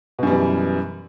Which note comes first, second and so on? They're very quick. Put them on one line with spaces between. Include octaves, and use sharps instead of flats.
B2 F#2 G3 E3